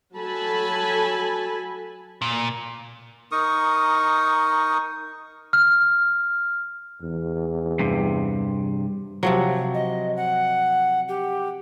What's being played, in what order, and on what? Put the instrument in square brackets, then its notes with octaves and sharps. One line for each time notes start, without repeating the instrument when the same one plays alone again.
[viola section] F#3 A4 G#5 A5 B5
[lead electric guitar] A#2
[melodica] D#4 A#4 C#6 D#6
[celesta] F6
[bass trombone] E2
[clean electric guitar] G2 C3
[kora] C3 F3 F#3
[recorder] D#5
F#5
G4